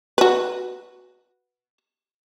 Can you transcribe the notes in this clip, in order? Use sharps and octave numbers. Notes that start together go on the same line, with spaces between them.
F#4 B4